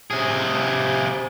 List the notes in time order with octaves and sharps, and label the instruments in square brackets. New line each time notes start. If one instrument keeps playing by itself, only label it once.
[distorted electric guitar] C3 G#4